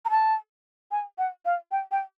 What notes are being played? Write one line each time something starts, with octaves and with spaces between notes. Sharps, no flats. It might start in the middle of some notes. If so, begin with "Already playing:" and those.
A#5
A5
G#5
F#5
F5
G5
G5